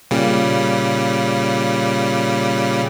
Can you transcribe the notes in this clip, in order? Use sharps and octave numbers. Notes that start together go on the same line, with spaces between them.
A#2 C#3 G3